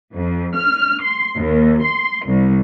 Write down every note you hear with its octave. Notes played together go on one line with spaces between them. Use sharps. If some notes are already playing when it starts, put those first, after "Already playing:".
F2
F6
C6
D#2
C6
C2